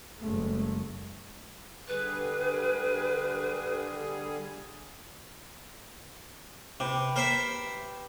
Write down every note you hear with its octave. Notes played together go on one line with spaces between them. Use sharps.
F#1 G#3 A3
D3 G3 G#4 B4
C3 G4 B4
A#4 C5 E5